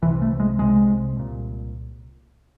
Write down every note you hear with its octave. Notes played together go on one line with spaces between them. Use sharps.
C2 C3 E3
A3
G#3
C2 C3 G#3
C2 A#2